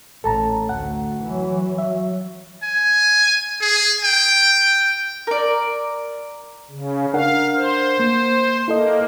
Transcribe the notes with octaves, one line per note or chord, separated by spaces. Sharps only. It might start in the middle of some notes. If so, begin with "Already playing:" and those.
A1 A4 A5 A#5
D2 F#5
E3 F#3
F#3 E5
G#5
G#4
G5
A#4 D5
C#3
D4 A#4 F5 F#5
C5
A#3
A#3 E4 A4 D#5